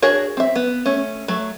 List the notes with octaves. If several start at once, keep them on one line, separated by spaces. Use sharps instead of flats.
D4 F#4 G#4 A#4 C#5
C4 E5
B3
A3 C#4
F#3 A3